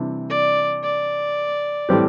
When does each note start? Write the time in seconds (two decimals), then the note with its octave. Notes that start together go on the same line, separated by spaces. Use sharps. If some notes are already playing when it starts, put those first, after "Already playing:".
Already playing: C3 E3 G3 D4
0.30 D5
0.84 D5
1.89 A2 E3 G3 C4 G4